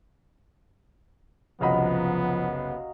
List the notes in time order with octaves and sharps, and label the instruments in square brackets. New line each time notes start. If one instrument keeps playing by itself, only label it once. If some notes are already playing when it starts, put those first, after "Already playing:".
[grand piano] F#1 C2 B5 [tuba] F3 [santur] F#3 D#5 F5 [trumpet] B3